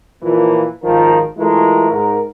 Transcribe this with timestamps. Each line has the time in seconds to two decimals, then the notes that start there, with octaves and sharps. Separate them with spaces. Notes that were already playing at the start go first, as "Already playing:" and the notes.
0.22 A#2 E3 F3 A#3
0.83 G#1 D#3 F3 F4 A#4
1.37 E3 G#3 A3 E4 F4 A#4
1.90 G#2 A#4